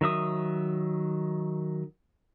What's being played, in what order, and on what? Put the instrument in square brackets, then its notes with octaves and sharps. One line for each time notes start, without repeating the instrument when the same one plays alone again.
[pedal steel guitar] D#3 F#3 E5 D#6